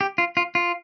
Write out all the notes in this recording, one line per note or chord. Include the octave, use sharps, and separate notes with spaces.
G4
F4
F4
F4